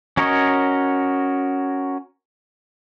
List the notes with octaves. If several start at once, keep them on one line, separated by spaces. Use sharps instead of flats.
C#4 F#4 A#4 C#5 D#5